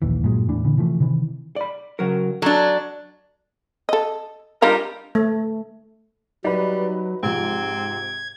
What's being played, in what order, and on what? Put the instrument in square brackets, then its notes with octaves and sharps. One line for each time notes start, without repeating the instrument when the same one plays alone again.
[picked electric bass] A#1 D#2 E3
G2 A#2 F#3 G#3
E2 A2 E3 D4
A#2 D3 E3
C3 E3 F3 A3
C3 D#3 E3
[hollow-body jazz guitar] D5 B5
C#3 F#3 A#4
[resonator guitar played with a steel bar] F#3 D4 [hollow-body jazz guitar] A4
[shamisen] A4 D#5
[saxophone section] G3 A#4 [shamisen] D4 D#4 F4
[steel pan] A3
[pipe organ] F#3 [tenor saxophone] G3 [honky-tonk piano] D#4 B4
[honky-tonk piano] G#2 C3 F3 [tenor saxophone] C4 [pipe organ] G#6